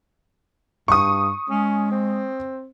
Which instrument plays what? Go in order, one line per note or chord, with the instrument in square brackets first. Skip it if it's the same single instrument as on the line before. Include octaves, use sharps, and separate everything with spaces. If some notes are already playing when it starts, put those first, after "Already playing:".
[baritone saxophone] G2 [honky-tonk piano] C#6 D#6
[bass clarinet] G#3 [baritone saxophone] C#4
[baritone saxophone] C4